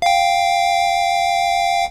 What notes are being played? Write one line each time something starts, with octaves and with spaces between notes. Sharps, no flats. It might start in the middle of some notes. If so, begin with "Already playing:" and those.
F5 G5